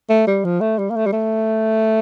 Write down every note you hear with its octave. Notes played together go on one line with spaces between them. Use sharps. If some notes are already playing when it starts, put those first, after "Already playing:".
A3
G3
F3
A3
G3
A#3
A3
G3
A3